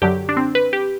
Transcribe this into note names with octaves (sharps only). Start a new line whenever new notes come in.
F#2 D3 F#3 G4
D4
C4
B4
G4